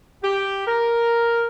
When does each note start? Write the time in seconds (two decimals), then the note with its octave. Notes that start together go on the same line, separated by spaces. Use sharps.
0.24 G4
0.67 A#4